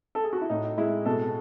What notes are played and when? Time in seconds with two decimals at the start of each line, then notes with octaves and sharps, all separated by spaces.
0.15 A4
0.24 G#4
0.33 F#4
0.41 E4
0.50 A2 D#4
0.77 G#3 E4
1.05 B2 A4